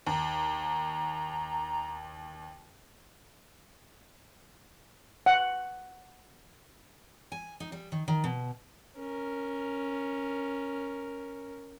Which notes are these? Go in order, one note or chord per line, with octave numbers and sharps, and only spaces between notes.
D#2 A#5
F#5
G#5
D#4
G3
D#3
D#3
B2
C#4 A#4